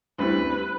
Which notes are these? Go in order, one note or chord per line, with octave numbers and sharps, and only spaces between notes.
D2 D3 G3 C4 E4 B4